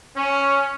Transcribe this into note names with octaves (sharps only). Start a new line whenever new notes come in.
C#4